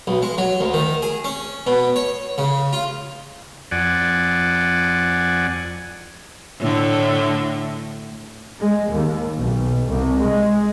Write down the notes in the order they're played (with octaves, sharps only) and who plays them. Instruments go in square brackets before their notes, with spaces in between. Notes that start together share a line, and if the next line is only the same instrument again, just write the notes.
[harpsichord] B1
G#3
F#3
D2
D#3
G#4
C#4
B2
C#5
C#3
F4
[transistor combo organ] F2 D5 F#5 G#5
[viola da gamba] A2 D3
[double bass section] G#3
D#2
B1
C2
G#3